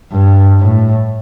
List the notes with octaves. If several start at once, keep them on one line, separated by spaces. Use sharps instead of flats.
G2
A2